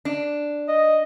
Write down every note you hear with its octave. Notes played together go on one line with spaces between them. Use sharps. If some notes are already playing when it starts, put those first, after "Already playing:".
D4
D#5